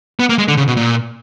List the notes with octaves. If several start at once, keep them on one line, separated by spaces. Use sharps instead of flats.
B3
A#3
G#3
D3
C#3
B2
A#2